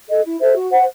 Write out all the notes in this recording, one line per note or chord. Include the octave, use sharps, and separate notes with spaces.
A4 D#5
E4
A4 C5 E5
F#4
C5 F#5